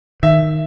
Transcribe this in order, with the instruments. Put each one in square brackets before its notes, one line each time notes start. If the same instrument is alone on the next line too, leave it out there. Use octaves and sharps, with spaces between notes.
[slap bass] D#3 [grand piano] E5